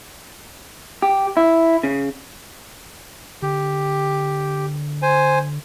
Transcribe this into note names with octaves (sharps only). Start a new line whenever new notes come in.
G4
E4
C#3
D3 G4
C5 G#5